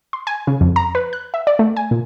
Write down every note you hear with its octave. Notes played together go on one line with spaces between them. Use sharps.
C6
G#5
C#3
F2
A#5
B4
F#6
E5
D5
A3
G#5
A#2